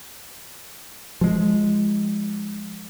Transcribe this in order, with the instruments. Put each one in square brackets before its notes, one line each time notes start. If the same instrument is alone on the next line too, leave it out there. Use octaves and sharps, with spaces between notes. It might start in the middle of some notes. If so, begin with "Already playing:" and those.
[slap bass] F3 G#3